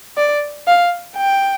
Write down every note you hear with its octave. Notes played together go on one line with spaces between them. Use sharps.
D5
F5
G5